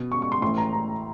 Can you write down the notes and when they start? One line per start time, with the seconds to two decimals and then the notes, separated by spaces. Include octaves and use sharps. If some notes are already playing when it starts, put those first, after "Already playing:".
Already playing: B2
0.12 C#6
0.22 C#6
0.32 C6
0.42 A2 E3 C6
0.58 A#5
0.73 A#5